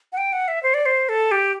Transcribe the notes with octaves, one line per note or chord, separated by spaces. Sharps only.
F#5
G5
F#5
E5
C5
D5
C5
A4
G4